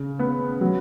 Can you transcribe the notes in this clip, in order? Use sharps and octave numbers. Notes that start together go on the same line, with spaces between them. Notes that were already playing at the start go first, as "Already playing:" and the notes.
Already playing: C#3
B3
F#3